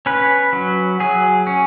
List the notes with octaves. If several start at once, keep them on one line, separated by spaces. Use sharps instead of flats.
C#4 B4
F#3
F#3 G#4
C#4